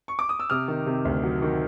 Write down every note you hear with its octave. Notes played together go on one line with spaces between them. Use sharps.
C#6
D6
D#6
E6
C3 D#6 F6
D#3
C3
D2
F#3
D#3